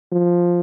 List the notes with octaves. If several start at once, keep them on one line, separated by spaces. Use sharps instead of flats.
F3